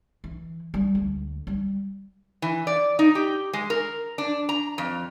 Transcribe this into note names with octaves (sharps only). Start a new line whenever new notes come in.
E3
G3
D2
G3
E3
D5
D#4
G4
G#3
A#4
D4
A#5
F2